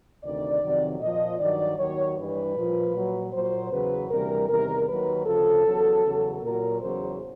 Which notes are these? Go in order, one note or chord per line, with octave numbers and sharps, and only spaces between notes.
D2 C3 D#3 D5
F2 C3 D#3 F#3
A#2 F3 D#5
G2 D#3 F#3 D5
D#2 D#3 F#3 C#5
G2 E3 G3 B4
A#2 F3
A#2 F#3
A#2 F#3 C5
E2 C#3 F#3 B4
D2 C3 E3 G3 A#4
E2 C3 D#3 G3 A#4
D#2 D#3 F#3 B4
D2 C#3 F3 A4
E2 C#3 F#3
E2 C#3 F#3
A#2 F#3 A#4
E2 C#3 F#3 C5